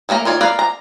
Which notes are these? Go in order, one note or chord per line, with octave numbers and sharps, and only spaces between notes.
F#3 A3 A#3 A#5
D#3 F4 C#5 D5
A#4 B4 D5 F5
A#5